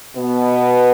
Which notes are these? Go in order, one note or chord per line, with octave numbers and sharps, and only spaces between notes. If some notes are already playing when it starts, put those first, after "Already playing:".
B2 B3